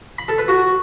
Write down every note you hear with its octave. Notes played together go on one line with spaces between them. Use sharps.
B5
A4
B4
F#4